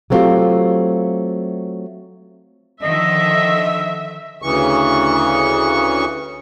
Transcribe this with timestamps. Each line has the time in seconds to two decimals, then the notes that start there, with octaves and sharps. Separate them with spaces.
0.10 F#3 A3 B3 C4 F4 G4
2.83 D3 D#3 F3 D#5 E5
4.42 D2 C#3 E3 C#6